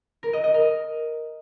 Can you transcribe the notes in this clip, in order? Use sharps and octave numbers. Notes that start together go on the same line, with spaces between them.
A#4
D#5
D#5
A#4